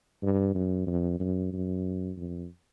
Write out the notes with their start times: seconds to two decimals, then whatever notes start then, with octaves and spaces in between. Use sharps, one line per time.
0.23 G2
0.55 F#2
0.87 F2
1.20 F#2
1.53 F#2
2.17 F2